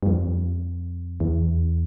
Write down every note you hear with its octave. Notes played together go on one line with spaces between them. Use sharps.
G2
F2
E2